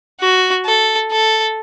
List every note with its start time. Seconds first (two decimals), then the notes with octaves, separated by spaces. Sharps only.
0.21 F#4
0.65 A4
1.11 A4